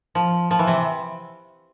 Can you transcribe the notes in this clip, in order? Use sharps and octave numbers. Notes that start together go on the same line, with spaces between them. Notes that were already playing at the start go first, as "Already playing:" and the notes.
F3
F3
E3
C3